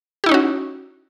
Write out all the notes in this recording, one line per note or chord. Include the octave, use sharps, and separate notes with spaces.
C#4 D#4 E4 F#4 G4